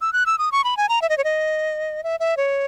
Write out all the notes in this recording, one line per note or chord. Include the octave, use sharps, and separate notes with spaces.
E6
F#6
E6
D#6
C#6
B5
G#5
A#5
E5
D#5
C#5
D#5
E5
E5
C#5